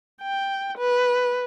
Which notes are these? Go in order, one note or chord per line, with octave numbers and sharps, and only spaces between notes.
G5
B4